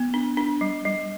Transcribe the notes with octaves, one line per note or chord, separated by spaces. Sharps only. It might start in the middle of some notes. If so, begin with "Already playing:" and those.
Already playing: B3
D4
D4
G3
G3